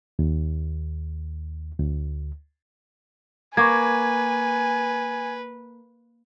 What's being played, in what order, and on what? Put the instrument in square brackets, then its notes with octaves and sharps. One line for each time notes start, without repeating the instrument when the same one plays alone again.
[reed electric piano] D#2
D2
[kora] A#3 [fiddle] B4 [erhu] G#5 [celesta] C#6 D6 G#6